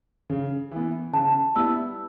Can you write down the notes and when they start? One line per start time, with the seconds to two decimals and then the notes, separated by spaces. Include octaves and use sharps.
0.30 C#3
0.72 E3 B3
1.13 C#3 A5
1.55 G3 B3 E4 E6